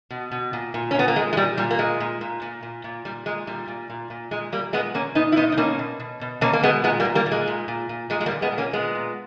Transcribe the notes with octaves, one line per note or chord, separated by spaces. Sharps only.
B2
B2
A#2
A#2
C#4
A#2 B3
A#3
A#2 G#3
G#3
A#2 G3
A#2 G3
A#3
A#2 G#3
A#2
A#2
A#2
A#2
A#2
A#2 G3
A#2 G#3
A#2 G3
A#2
A#2
A#2
A#2 G#3
A#2 G3 A#3
A#2 G#3 B3
A#2 A#3 C#4
A#2 B3 D#4
E4
A#2 B3 D#4
D#4
B2 A#3 C#4
B2
B2
B2
B2 A#3 C#4
A#3
B2 G#3 B3
A#2 G#3 B3
G3 A#3
A#2
G3 A#3
A#2
G#3
A#2
A#2
A#2
A#2 G#3
G#3
G3 A#3
A#2
G#3 B3
A#2
A#3 C#4
A#2 G#3 B3
A#2